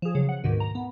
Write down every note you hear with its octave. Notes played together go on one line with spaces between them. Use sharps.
F3 G#4
C#3 F#3
F#5
D2 G#2 B2 D#3
A#5
B3